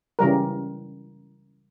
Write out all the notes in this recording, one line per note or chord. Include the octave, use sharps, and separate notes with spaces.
C#3 E3 G3 A#4